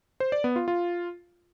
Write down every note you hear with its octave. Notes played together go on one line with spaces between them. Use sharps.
C5
D5
B3
F4
F4